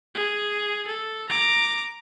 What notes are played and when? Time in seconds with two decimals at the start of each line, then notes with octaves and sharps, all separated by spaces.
0.15 G#4
0.87 A4
1.30 A#5 D6